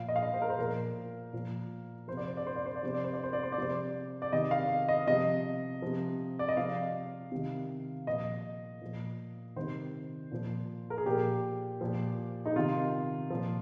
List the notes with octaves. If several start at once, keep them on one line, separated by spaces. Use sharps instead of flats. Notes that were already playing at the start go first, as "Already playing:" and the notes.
Already playing: A#2 F3 F5
D#5
F5
D#5
C5
A#4
C5
A#2 F3 A#4
A#2 F3
C3 F3 C5
D5
C5
D5
C5
D5
C5
D5
C3 F3 C5
D5
C5
D5
C5
D5
C5
D5
C3 F3 C5
D5
C3 D#3 D#5
F5
D#5
C3 F3 D#5
C3 F3
D5
D#5
C3 F3 F5
C3 D#3
A#2 F3 D#5
A#2 F3
C3 D#3 C5
A#2 F3
A#4
G#4
A#2 F3 G4
A#2 F3
D#4
C3 D#3 F4
A#2 F3